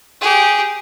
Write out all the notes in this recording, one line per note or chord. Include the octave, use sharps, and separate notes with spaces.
G4 G#4